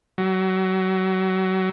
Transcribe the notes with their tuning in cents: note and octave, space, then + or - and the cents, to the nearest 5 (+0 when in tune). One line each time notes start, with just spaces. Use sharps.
F#3 +30